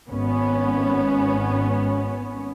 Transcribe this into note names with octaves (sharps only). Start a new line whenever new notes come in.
G#1 B3 C#4